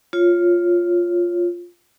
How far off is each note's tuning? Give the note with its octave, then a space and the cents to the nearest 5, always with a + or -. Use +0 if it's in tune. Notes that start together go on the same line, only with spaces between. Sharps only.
F4 +0 C#5 +0